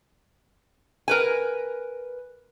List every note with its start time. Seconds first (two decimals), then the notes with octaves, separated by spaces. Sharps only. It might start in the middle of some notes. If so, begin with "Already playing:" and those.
1.08 A#4 B4 G#5